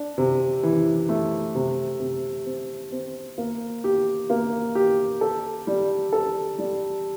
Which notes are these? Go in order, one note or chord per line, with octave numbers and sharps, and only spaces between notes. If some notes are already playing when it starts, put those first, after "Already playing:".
Already playing: D4
C3
E3
A3
C3
C3
C4
C4
A#3
G4
A#3
G4
A4
G3
A4
G3